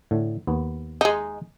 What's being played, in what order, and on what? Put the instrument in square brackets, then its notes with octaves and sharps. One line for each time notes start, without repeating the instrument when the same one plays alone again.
[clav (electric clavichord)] A2 D3
D#2 B3
[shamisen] G#3 D#4